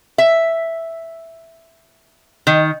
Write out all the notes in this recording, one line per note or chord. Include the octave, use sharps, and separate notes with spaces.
E5
D#3